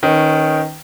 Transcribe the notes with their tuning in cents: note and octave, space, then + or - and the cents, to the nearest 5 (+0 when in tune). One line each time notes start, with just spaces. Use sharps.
D#3 +0 C#4 -15 B4 +20